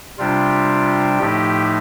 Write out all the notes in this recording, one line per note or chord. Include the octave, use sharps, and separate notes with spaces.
C3 G3 D4 F4
A2 F3 A3 D#4 G4